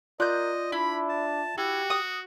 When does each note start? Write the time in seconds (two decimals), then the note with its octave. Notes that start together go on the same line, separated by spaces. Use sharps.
0.20 F4 A#4 D5 D#5 C6 F#6 G6
0.72 D4 E4 B5
1.09 A5
1.58 E4 F#4 G4
1.90 D#6